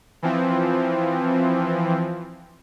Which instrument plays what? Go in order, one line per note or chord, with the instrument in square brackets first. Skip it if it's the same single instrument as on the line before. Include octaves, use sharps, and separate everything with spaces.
[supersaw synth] E3 F3 C4